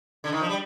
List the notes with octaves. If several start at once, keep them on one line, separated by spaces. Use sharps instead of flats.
D3
D#3
F3
G3